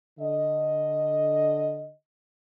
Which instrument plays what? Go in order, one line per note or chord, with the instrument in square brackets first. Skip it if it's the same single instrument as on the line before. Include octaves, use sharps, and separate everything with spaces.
[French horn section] D3 D#5